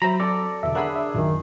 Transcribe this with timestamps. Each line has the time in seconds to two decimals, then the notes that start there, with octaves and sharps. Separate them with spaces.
0.02 F#3 C5 E5 A#5 B5
0.20 C4 A4 D5
0.63 E2 B2 D3 E5
0.75 D4 G#4 A#4 C#5 E5 F#5 B5
0.95 E5
1.14 A#1 F#2 A#2 D#3